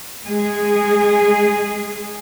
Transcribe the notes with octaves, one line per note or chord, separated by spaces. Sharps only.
G#3 G#4